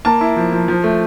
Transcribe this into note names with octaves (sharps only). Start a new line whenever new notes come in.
A#3 A5
E4
F3
F3
F3
A3